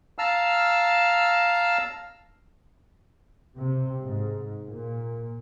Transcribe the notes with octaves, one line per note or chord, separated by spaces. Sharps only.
F5 A5 A#5 E6 F6
C3
G#2
A#2